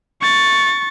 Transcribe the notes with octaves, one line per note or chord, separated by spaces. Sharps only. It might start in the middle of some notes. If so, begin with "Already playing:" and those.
C#6 A6